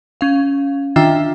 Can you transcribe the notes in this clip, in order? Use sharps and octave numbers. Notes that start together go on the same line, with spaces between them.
C#4 F5
D#3 D4 F4 E5 G5 E6